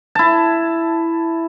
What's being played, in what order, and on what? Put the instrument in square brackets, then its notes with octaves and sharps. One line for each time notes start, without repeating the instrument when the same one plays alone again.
[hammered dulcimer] E4 A5